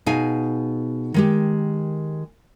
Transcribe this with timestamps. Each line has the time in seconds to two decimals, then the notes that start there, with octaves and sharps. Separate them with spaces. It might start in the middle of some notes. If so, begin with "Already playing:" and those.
0.06 B2 D#4 G#4 F5 G#5
1.14 D#3 G#3 G4